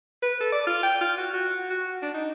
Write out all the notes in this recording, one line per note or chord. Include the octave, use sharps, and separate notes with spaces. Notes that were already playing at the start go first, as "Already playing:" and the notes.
B4
A4
D5
F4
G5
F4
F#4
F#4
F#4
D4
D#4